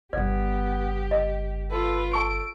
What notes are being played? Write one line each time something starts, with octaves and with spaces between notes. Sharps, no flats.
G1 C#3 B3 G4 D5
D#5
F4 A4 B4
A4 A5 C#6 D7